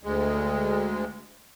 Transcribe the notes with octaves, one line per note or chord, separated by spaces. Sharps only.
D2 G#3